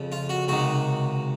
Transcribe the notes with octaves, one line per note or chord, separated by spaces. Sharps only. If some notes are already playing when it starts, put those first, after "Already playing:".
Already playing: F2 C#3 F3
F4
F#4
C#2 C3 D#3 F#4